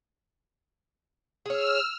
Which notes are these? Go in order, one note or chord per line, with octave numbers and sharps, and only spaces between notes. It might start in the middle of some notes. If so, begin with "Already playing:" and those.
G#4 C#5 E6 F6